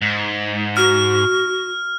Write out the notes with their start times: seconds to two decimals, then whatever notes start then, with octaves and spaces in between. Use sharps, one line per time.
0.02 G#2
0.77 F#4 F6